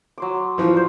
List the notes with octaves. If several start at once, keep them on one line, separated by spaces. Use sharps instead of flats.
F#3 C6 D6
E3 F3
C5 D5